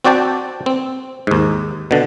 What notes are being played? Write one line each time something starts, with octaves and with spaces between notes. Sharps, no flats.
C4 F#4 D5 G5 A5
C4
D#2 G#2
B2 D3